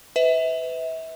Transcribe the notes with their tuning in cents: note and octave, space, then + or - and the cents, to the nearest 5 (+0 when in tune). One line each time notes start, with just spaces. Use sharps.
B4 +30 E5 -30